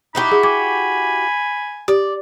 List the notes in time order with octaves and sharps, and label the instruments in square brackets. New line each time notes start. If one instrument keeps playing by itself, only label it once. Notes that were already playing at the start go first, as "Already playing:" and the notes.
[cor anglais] D#4 [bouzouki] E4 F#4 G4 [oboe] B5
[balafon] G#4
[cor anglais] G#5 [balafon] D6
[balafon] G4 [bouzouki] D5